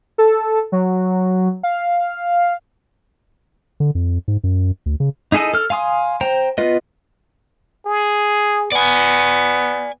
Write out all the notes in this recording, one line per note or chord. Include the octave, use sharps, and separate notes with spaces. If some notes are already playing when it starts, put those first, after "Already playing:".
A4
F#3
F5
D3
F2
G#2
F#2
D2
C#3
D#4 E4 G#4 A4 D#5
A4 F6
F5 G#5 C6 D#6
C5 G5 A#5
B3 F4 B4 D#5
G#4
B3 D5 G#5